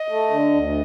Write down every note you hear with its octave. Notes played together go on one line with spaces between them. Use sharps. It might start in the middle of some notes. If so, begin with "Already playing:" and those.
Already playing: D#5
A3
D3
D2